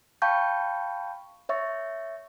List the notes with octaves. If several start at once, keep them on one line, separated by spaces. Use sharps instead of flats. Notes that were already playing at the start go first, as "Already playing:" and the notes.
F5 G5 A5 B5 C#6 G6
C#5 E5 C#6 A6